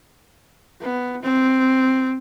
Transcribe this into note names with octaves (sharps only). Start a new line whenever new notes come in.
B3
C4